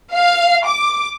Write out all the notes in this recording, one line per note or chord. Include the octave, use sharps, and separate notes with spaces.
F5
D6